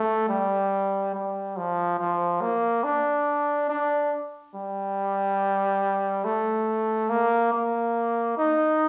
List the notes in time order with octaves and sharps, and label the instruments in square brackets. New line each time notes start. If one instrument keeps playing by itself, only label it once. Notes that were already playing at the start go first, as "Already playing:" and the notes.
Already playing: [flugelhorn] A3
G3
G3
F3
F3
A#3
D4
D4
G3
A3
A#3
A#3
D#4